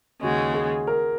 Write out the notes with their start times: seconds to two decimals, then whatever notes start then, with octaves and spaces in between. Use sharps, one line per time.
0.22 D#2 C#3 G#3 F#4
0.54 G#4
0.87 A#4